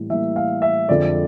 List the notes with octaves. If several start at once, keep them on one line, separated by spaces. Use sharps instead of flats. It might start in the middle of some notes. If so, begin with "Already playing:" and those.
Already playing: A2 E3 G3 A#3
A2 E3 G3 A#3 E5
F5
E5
F2 D3 F3 G#3 D5